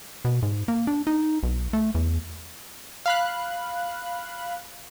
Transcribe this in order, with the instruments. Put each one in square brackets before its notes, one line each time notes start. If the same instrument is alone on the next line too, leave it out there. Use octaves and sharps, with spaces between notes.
[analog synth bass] B2
G#2
A#3
D4
D#4
B1
A3
E2
[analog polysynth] F5 B5 F#6